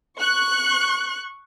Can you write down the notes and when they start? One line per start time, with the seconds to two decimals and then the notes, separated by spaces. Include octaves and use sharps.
0.17 C#6 F#6